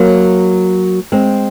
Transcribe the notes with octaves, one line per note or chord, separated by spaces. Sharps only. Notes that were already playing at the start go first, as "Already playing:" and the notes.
Already playing: F#3 A#3
G#3 C4